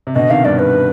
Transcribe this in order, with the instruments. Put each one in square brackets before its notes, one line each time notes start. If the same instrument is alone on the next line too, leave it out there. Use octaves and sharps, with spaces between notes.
[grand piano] C3
[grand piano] B2 D3 [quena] D#5
[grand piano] C3 D#3 [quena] F5
[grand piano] G2 [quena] D5
[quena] B4